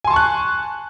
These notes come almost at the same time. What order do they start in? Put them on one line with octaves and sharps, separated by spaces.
G#5 C6 A5 C#6 F#6